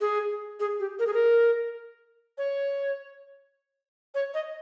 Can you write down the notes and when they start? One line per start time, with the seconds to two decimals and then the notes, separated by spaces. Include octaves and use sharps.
0.01 G#4
0.60 G#4
0.80 G4
0.99 A#4
1.07 G#4
1.13 A#4
2.38 C#5
4.15 C#5
4.34 D#5